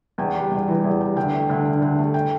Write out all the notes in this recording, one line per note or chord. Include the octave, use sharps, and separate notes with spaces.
E2 G5
G3
E2
E3
E2
G3
D2 G5
A3
D2
D3
D2
A3
G5